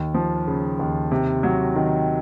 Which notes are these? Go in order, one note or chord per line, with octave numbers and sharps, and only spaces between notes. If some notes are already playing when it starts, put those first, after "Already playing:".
Already playing: D#2
F3
C#3
D#2
C3
F#3
D#3